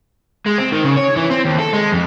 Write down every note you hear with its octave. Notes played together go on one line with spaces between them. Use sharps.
G#3
C4
D#3
C#3
C#5
E3
C4
D#2
A4
G#3
F2